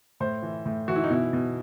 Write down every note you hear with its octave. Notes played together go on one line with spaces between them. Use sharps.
A2 C5
E3
A2
E3 F#4
E4
D#4
B2 E4
B2